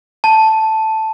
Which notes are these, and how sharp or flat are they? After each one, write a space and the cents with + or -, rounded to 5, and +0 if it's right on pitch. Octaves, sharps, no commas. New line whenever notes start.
A5 +0